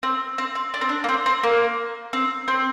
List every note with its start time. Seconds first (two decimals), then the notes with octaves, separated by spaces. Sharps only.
0.03 C4
0.38 C4
0.55 C4
0.74 D4
0.81 C4
0.89 D4
1.04 A#3
1.09 C4
1.26 C4
1.43 A#3
2.13 C4
2.48 C4